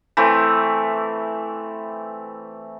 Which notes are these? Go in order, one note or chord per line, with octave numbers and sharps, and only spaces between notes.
E3 A3 C4